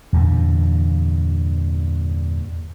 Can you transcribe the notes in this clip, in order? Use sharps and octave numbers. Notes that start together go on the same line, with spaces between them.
E2 G2 A#2 D3